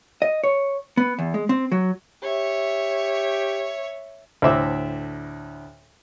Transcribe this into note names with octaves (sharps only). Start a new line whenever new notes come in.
D#5
C#5
B3
E2
G#3
C4
F#3
G4 C#5 E5
D2 A2 C5 E5 D6 E6